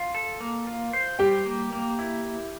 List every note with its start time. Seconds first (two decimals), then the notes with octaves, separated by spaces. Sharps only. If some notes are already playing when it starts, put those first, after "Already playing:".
Already playing: F4
0.15 A4
0.40 A#3
0.67 F4
0.93 C5
1.19 G3 G4 G5
1.46 A#3
1.73 A#3
1.99 E4